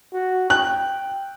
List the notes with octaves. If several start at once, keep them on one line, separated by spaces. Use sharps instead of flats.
F#4
G5 F#6